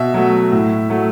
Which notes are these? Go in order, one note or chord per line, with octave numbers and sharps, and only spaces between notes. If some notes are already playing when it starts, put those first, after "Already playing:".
Already playing: B2 E5
F#3 A3
A2
F#3 A3